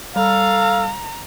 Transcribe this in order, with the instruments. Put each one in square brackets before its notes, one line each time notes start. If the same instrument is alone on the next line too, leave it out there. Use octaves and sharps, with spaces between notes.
[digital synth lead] G3 [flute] A4 [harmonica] F5 [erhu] A#5